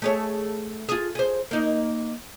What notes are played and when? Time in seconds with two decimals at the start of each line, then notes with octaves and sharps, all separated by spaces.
0.02 A3 G#4 C#5
0.89 F4 G#4
1.15 G#4 C5
1.51 A#3 D#4